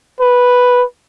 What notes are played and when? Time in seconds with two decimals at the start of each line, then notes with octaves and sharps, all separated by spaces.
0.20 B4